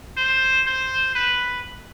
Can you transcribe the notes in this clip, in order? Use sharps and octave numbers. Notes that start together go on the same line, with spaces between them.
C5
C5
B4